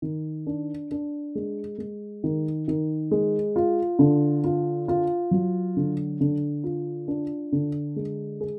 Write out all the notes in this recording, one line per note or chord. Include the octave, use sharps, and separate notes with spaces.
D#3
D4
D4
G#3
G#3
D#3
D#3
G#3
F4
D3
F4
F4
F#3
D3
D3
F4
D4
D3
G#3
G#4